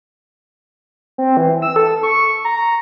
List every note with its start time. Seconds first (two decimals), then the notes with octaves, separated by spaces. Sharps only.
1.18 C4
1.37 E3
1.62 E6
1.76 A4
2.03 C#6
2.45 A#5